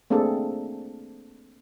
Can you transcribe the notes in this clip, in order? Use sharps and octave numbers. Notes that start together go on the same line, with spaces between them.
A3 A#3 C4 D4 G#4 A4